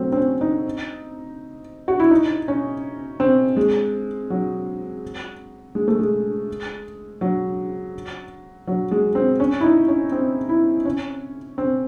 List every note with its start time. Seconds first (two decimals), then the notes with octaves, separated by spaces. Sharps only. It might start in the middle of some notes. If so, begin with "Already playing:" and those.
Already playing: F#3 A3 C4
0.12 C4
0.17 C#4
0.41 D#4
1.88 F#4
2.00 E4
2.11 D#4
2.48 C#4
3.20 C4
3.57 G#3
4.30 F#3
5.75 G#3
5.88 A3
5.99 G#3
7.21 F#3
8.67 F#3
8.91 G#3
9.15 C4
9.40 C#4
9.60 E4
9.63 D#4
9.88 C#4
10.12 C4
10.49 E4
10.85 C#4
11.58 C4